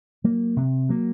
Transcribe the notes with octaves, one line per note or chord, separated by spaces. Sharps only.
F#3 A#3
C3
F#3 A#3